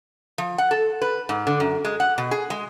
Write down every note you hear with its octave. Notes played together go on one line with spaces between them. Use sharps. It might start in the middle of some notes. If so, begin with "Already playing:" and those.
F3
F#5
A4
B4
G#2
D3
F#2
G#3
F#5
B2
G#4
G#3